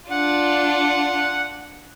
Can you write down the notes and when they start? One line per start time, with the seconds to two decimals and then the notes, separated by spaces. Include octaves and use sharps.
0.10 D4 F4 F#5